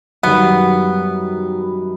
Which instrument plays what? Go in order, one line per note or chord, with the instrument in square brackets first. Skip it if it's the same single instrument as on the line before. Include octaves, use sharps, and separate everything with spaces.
[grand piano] F#2 D#3 G3 [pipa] B3